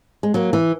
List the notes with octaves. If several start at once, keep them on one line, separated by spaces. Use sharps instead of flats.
G#3
F#3 A#3
E3